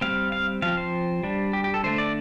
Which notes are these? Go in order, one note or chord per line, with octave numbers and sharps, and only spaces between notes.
G3 C4 F5
F5
F3 C4 F5
C5
G3 D4
G4
G4
A4
D3 A3 D4 C5
D5